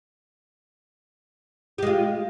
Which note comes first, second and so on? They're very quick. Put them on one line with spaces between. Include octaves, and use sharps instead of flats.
G4 G#3 F4